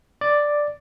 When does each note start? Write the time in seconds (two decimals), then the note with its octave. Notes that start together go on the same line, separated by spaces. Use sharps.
0.21 D5